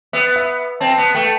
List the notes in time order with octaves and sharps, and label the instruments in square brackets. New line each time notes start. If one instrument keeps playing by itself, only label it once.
[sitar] B3 [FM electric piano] E5
[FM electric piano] E5
[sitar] C4 [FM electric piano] A5
[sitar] B3
[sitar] A3 [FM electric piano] G5